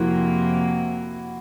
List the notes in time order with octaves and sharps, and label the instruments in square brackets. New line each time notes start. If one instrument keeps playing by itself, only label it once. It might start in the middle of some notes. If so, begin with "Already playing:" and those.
Already playing: [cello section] F2 C3 F3 A#3 [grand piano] E4 F#4